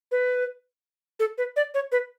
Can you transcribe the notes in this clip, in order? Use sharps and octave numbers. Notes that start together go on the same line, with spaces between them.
B4
A4
B4
D5
C#5
B4